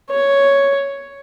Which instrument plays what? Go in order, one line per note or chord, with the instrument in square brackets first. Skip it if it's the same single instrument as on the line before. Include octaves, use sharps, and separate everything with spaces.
[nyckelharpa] C#5